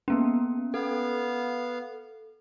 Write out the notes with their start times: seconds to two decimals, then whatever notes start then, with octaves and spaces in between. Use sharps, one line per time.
0.08 A#3 B3 C#4
0.74 B3 A4 F5